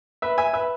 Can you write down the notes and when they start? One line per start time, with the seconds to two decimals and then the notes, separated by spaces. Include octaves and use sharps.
0.22 B4 E5
0.38 E5 G#5
0.53 B4 E5